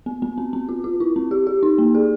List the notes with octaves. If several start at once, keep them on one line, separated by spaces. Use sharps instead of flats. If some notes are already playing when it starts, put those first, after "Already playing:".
B3
B3
C4
C4
F4
F4
E4
C4
G4
G4
D#4
A#3
G#4